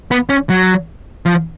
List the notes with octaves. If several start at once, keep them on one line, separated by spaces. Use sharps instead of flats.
B3
C#4
F#3
F3